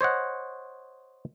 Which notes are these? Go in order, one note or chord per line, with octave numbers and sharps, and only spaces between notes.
C5 C#5 D#5 F#5